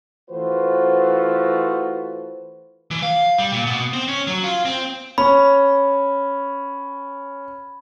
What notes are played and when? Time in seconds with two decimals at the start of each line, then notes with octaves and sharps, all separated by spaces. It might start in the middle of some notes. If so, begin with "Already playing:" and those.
0.30 E3 A3 F4 F#4 B4 C5
2.91 E3
3.03 F5
3.38 G3
3.52 A#2
3.67 B2
3.93 C4
4.08 C#4
4.27 F#3
4.44 F4
4.65 C4
5.18 C#4 B5